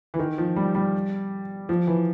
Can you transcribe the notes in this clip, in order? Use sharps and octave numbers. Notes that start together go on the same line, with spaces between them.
E3
D#3
F3
G3
G3
F3
E3